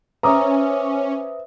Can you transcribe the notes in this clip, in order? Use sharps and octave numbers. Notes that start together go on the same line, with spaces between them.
C#4 B4 C5 E5 A#5 D6 D#6